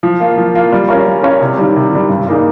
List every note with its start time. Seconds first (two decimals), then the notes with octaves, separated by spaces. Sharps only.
0.03 F3
0.20 A#3 F4
0.38 F3
0.55 A#3 F4
0.72 G3
0.89 C#4 F4 A#4 C#5
1.07 G3
1.23 C#4 F4 A#4 C#5
1.41 C3
1.58 D#3 G3
1.76 C3
1.92 D#3 G3
2.09 G2
2.27 G3 A#3 D#4 G#4